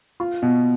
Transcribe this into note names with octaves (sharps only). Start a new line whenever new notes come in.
F4
B2